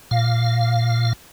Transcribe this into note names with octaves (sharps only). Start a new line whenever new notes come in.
A#2 F5